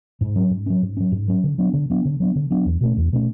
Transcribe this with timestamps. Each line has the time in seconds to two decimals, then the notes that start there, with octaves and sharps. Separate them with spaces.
0.21 G#2
0.36 F#3 C#4
0.50 G#2
0.66 F#3 C#4
0.82 G#2
0.97 F#3 C#4
1.12 G#2
1.28 F#3 C#4
1.44 D3
1.58 F#3 B3 D4
1.73 D3
1.90 F#3 B3 D4
2.05 D3
2.20 F#3 B3 D4
2.35 D3
2.50 F#3 B3 D4
2.65 E2
2.81 B2 A3 C#4
2.97 E2
3.12 B2 A3 C#4